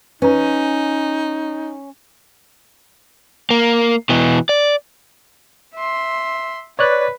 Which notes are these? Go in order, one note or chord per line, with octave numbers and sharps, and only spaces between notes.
C#4 D#4 B4 A#5
A#3
B2 E3
D5
E5 C6
B4 C#5 D5 F#6